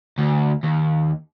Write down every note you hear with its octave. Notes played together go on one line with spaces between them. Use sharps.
D2
D#2